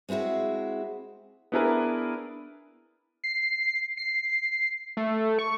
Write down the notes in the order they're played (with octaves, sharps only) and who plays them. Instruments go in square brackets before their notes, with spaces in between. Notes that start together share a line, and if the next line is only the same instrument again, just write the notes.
[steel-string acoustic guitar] G#3 C4 E4 F#4 G#4
[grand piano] B3 D4 E4 G#4 A#4 B4
[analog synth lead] C7
C7
A3
C#6